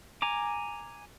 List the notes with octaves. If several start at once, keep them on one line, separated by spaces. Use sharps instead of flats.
G#5 A#5 D6